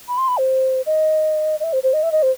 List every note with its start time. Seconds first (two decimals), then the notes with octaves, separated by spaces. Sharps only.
0.08 B5
0.18 C6
0.28 B5
0.38 C5
0.86 D#5
1.60 D#5
1.64 E5
1.73 C5
1.83 C5
1.93 D#5
2.03 E5
2.12 D#5
2.22 C5